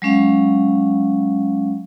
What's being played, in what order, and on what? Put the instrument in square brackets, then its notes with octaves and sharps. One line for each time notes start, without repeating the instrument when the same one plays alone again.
[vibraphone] F#3 G#3 C#4 F5